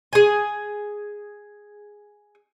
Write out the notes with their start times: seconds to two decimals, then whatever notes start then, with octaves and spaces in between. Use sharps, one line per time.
0.13 G#4 G#5